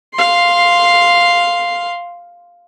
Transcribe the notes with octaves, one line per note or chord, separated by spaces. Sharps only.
F5 C6